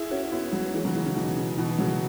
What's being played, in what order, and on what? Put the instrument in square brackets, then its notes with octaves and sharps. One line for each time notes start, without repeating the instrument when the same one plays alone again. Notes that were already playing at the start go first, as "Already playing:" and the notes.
Already playing: [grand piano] E4 G#4
C#4 F#4
B3 E4
F#3 B3
E3 G#3
C#3 F#3
E3 G#3
C#3
B2 E3
C#3
B2 E3
C#3 F#3